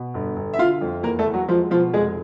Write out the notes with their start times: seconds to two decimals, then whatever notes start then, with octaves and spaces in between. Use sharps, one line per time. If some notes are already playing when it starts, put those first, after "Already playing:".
Already playing: B2
0.14 G1
0.36 G1
0.54 E5
0.59 D3 F4 F5
0.81 F2
1.03 E2 A#3 A#4
1.19 A3 A4
1.26 E2
1.34 F#3 F#4
1.49 F3 G#3 F4
1.70 B2 F3 F4
1.93 F1 G#3 G#4